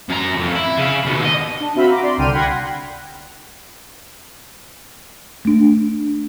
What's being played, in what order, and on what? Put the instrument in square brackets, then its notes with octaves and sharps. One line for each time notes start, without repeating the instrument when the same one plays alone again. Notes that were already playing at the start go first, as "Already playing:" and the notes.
[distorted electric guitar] F#2 A#5
F2
E4
C#3 F5
D#2 B2
D#5
[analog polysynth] D4
C4 F#4 E5 F5 B5
A#5 D6
D5 C6
C2 D3 G5 F6 D#7
F#5 G5 B5 C6 G#6 A#6
[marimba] A3 D4